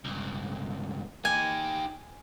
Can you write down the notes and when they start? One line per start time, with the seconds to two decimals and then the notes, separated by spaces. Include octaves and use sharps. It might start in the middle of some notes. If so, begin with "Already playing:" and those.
0.05 C#2 G2
1.25 D#4 G4 G#5